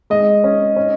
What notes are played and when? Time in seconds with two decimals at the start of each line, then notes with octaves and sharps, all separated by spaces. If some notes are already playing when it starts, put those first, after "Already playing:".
0.10 G#3 D#5
0.44 C#4
0.76 C#4